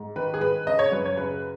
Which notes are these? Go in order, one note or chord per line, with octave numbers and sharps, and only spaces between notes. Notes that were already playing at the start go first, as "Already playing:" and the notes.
Already playing: G#2
D#3 B4
G#4
G#2 B4
C#3 D#5
C#5
F#2 B4
C#5
C#3 B4